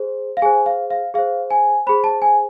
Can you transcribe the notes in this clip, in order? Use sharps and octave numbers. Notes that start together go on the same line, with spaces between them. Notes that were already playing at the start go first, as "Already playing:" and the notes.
Already playing: G#4 C5
F5
G#4 C5 G#5
F5
F5
G#4 C5 F5
G#5
G#4 C5 B5
A5
G#5